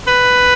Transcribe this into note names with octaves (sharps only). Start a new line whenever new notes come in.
B4